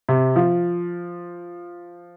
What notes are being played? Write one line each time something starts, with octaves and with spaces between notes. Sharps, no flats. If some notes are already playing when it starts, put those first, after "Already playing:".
C3
F3